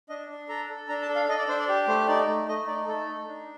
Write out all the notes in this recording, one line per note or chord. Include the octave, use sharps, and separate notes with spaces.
D4 D#5
D4
A4 A#5
A4
D4 A#5
A5
A4
F5
A4 D#5
D5
D4 C5
D5
G4
A3 C5
D#4 D5
A3
A3 D#5
D#4 D5
A3 A4
D#4
D4